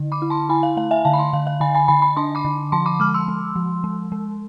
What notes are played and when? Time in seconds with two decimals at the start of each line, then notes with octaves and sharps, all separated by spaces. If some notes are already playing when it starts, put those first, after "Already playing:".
Already playing: D3
0.12 B5 D6
0.22 E4
0.30 A5 C6
0.49 E4 G#5 B5
0.63 F5
0.77 A3 F5
0.91 E5 G#5
1.05 D3 F5 A5
1.13 B5
1.18 A5 C6
1.33 D3 F5
1.47 F5
1.60 D3 G#5 B5
1.75 G#5 B5
1.88 D3 G#5 B5
2.02 G#5 B5
2.17 D4 A5 C6
2.35 B5 D6
2.45 D3
2.72 F3 A5 C6
2.86 B5 D6
3.00 G#3 D6 F6
3.14 C6 E6
3.28 G#3
3.56 F3
3.84 G#3
4.12 G#3